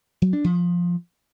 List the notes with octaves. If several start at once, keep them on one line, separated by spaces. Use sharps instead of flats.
F#3
D4
F3